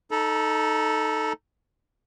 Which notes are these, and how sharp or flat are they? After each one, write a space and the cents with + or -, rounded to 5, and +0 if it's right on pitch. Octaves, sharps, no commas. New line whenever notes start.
D#4 -5 A4 +0 A#5 +45